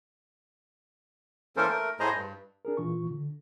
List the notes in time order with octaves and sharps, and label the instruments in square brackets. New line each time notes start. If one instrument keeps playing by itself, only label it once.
[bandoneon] E3 A#3 C#4 A4 A#4 C5
A3 A#4
A2 A3 G#4 C5 D#5 A#5
G2
[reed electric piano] D4 G#4 A#4
A#2 E3 F4 C#6
D3